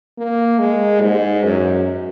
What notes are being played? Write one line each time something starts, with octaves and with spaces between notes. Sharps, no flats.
A#3
G#3
G#2
F#2